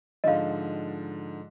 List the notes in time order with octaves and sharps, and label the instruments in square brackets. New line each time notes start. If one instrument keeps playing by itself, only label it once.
[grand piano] G#2 D3 F3 [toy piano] D#5 F5